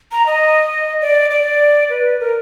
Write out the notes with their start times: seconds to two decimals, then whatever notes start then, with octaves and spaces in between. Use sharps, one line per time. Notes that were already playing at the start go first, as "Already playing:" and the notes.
0.12 A#5
0.26 D#5
1.01 D5
1.30 D5
1.90 B4
2.20 A#4